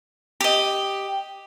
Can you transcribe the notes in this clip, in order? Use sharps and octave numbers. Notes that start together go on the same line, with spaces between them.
G4 D#5